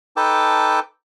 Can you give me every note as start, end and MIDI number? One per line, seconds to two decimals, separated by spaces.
0.17 0.80 63
0.17 0.80 69
0.17 0.80 71
0.17 0.80 79
0.17 0.80 81
0.17 0.80 86